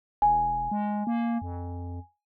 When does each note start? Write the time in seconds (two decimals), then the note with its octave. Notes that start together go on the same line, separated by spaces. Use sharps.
0.22 E1 G#5
0.71 G#3
1.07 A#3
1.42 F2